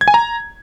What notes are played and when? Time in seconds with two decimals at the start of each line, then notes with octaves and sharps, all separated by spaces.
0.01 G#6
0.08 G#5
0.14 A#5